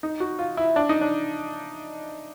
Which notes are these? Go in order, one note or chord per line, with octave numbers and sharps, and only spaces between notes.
D#4
F#4
F4
E4
D4
D#4
D4